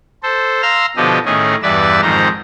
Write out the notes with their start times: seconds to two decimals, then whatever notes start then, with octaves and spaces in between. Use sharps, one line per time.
0.23 A4 C5
0.62 F5 A#5 C6 E6 F6
0.97 B2 D3 F3 G4 D#5
1.25 A2 D#3 C#4 D#4 G#4
1.63 E2 G2 B4 D5 E5 E6
2.02 F2 G#2 D#3 C5 A#5